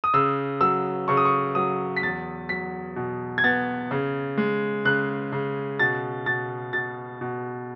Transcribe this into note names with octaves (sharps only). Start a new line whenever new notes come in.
D#6
C#3 E6
F#3 E6
C#3 C#6
D#6
C#6
F#3 D#6
B6
E2 A6
F#3 B6
B2
G#6
B3 A6
C#3
G#3
C#3 F#6
C#3
B2 A6
B2 A6
B2 A6
B2